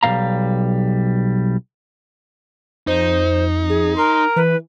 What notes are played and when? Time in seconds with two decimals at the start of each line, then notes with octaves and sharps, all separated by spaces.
0.03 B1 E3 G3 F5 A#5
2.87 F2 D#4 C5
3.70 G#4
3.96 A#4 C6
4.36 E3 B4